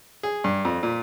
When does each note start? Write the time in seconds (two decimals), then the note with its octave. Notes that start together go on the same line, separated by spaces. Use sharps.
0.23 G#4
0.44 G2
0.65 F2
0.83 A#2